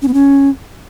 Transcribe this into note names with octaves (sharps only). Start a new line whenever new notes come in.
C#4
B3
C#4